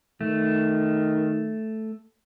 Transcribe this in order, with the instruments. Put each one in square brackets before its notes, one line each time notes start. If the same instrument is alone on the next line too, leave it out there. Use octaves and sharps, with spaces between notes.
[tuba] D#3 [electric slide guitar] A3